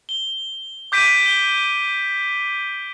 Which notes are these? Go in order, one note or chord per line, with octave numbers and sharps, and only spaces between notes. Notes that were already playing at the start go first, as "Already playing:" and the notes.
G7
D6 G6 B6 D7 D#7
G7